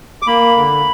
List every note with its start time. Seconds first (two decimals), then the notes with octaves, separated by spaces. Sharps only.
0.22 D6
0.27 A#3 B5
0.57 D3